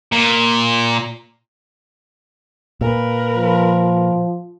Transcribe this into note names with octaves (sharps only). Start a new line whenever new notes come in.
A#2
A#2 A#4 B4
F3